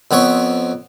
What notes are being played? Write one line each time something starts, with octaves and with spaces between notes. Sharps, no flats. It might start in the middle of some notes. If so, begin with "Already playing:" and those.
F2 B3 C4 C#5 C#6